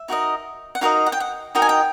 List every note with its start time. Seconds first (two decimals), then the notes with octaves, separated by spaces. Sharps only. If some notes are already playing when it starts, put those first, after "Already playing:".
Already playing: E5
0.08 D#4 F#4 A#4 D#5
0.75 F#5
0.81 D#4 F#4 A#4 D#5 F5
1.06 F#5
1.12 G5
1.20 F#5
1.55 D#4 F#4 A#4 D#5 G5
1.62 G#5
1.69 G5